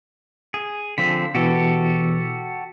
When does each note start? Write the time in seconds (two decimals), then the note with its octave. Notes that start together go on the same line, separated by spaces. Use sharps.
0.54 G#4
0.98 D3 F3 C4 B6
1.35 B2 E3 F#4 G4 A4